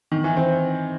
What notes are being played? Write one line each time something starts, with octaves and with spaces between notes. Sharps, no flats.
D#3
E3
C4